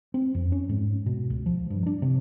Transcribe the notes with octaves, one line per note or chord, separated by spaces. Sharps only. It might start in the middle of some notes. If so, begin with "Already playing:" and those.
C4
F2
C#4
G#2
B2
C#2
F3
G2
D4
C3